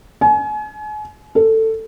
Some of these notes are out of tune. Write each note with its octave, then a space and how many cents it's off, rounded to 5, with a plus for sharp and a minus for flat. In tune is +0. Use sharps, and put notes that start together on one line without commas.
G#5 +35
A4 +15